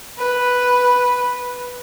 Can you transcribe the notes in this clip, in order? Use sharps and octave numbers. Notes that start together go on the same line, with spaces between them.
B4